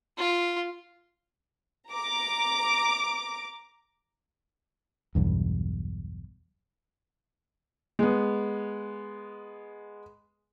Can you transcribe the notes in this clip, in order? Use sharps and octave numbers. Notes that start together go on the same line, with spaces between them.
F4
A#5 D6
B1 E2 G2
G#3 B3